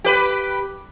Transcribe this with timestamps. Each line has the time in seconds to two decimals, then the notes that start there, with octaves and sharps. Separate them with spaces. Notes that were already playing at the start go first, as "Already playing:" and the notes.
0.04 G4 B4